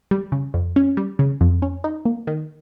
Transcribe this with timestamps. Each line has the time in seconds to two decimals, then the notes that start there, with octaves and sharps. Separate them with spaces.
0.11 G3
0.32 C#3
0.54 F2
0.76 C#4
0.97 G3
1.19 C#3
1.41 F2
1.62 C#4
1.84 D#4
2.05 A#3
2.27 D#3